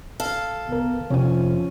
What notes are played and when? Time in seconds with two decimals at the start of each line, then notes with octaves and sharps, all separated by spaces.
0.20 A4 F5
0.69 C2 B3 A#4
1.10 F2 C3 F3 C#4 G#5